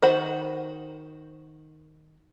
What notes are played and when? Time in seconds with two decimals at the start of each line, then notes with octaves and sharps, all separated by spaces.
0.02 D#3 F#4 C5 F#5 B5